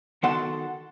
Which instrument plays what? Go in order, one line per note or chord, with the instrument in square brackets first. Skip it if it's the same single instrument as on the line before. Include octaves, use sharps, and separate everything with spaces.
[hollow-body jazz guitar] D#3 B3 F#4 A4 F#5 C6